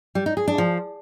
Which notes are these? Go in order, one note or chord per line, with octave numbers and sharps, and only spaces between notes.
G3
D#4
G#4
D4
F3